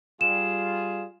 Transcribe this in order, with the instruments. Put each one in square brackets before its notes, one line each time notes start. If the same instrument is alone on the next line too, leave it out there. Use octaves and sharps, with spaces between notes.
[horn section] G3 F4 G#4 [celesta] E7